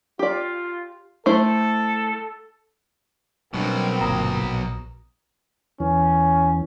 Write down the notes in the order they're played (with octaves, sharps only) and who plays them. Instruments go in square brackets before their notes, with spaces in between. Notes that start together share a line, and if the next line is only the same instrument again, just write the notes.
[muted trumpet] F4 [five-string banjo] G4 D5
[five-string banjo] A3 E4 C5 [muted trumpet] A4
[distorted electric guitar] B1 B2 [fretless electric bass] G3 D4 [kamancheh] A#3 C4
[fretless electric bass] G1 A#2 [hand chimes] A#5 D#6
[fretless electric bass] A#1
[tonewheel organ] E2 E3 [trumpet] C#4